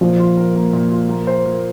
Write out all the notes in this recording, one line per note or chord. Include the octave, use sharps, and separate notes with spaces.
A#2 F3
F4
A#4
A#3
A#2
F4
A#3
C5
A#3